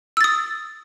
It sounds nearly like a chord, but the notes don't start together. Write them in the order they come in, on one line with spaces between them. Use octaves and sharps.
E6 A6 D#6